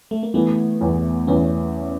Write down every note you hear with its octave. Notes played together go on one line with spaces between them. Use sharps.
A3
A#3
E3 A3 B3
E2
E2 B3 C#4